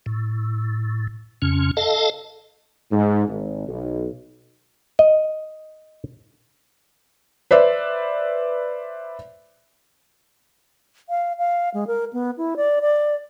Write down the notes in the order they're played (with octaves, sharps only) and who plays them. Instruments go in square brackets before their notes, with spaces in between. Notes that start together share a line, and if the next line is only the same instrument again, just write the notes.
[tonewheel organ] A2
F2 C#3 C#4
A4 D#5 F5 A5
[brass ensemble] G#2
G#1
B1
[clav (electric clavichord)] D#5
[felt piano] B4 C5 D5 E5
[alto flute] F5
F5
G#3
A#4
B3
E4
D5
D5